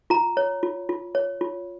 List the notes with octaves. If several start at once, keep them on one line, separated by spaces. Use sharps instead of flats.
F4 A#5
C#5
F4
F4
C#5
F4